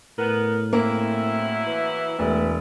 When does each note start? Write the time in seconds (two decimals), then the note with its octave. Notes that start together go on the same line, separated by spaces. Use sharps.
0.18 A2 B3 A#4
0.73 F#2 A#3 C4 E4
1.66 E3
2.19 E1 E3 A3